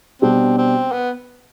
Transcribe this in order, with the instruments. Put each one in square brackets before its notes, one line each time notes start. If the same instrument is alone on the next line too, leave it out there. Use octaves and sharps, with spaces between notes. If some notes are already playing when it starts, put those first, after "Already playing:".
[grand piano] B2 G3 D4 [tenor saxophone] C4
[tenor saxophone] C4
B3